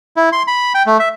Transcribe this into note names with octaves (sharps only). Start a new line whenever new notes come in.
E4
C6
B5
G5
A3
E5